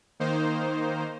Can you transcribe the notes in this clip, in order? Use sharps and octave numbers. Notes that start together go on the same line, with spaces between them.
D#3 A#3 D#4 C5